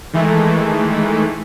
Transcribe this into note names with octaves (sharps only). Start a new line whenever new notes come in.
D#3 E3 G#3 A3